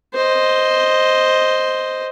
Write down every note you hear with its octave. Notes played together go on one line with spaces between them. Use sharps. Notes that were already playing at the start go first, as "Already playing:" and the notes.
C5 D#5